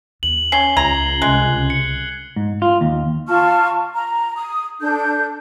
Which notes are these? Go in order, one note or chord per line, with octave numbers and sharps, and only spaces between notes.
D#2 F#7
C#4 C7 G7
C#2 A#5 G#6
C2 G#3 F#6
C#7
G#2
F4
D#2
F4 A5 C#6 F6
A#5
D#6
D4 A4 G6